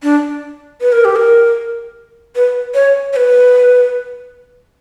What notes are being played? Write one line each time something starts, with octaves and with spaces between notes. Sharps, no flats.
D4
B4
A#4
G4
A#4
B4
C#5
C#5
B4